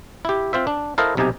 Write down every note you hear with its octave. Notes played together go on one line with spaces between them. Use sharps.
E4 G4
C4 F4 C5 E5
D4
E4 A4 A#4 C5 D#5 F5
B1 C3 D#4 G4 G#5